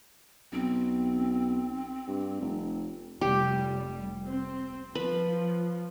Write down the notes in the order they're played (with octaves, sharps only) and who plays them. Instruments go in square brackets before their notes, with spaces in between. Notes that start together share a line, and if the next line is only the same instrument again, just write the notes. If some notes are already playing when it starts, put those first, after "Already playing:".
[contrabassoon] B1 [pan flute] C4
[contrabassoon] G2
F1
[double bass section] F1 G3 [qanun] G4
[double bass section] C4
[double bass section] F3 [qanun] B4